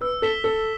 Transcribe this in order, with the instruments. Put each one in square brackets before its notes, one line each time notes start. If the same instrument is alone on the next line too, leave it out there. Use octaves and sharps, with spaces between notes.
[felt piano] B4 [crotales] E6
[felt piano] A4 [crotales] B6 E7 G7
[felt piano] A4 [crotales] E6